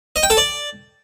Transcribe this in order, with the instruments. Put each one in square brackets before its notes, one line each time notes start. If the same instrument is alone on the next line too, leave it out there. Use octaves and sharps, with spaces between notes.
[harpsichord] D#5
G5
A4
D5